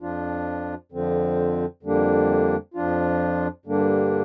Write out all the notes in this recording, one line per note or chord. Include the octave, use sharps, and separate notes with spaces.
F2 F3 D4 F4
F2 D3 F3 C4
F2 D3 G3 A#3 D4
F2 F3 D4 F4
G2 D3 G3 A#3 D4